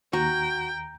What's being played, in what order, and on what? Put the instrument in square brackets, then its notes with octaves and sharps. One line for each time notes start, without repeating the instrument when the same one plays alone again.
[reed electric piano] D#2 A#5 [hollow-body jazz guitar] F#4 [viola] G5